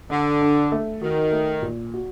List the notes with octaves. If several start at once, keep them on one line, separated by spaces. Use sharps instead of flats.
D3 D4
D4
A3
D#3 F#4
A3
A#2
F#4